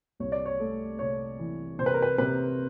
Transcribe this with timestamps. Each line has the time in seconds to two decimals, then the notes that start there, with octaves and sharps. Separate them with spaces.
0.20 C2 C#5
0.32 D5
0.46 C#5
0.60 A3
0.99 C3 C#5
1.39 E3
1.79 C3 C5
1.86 B4
1.94 A#4
2.02 B4
2.18 C3 B4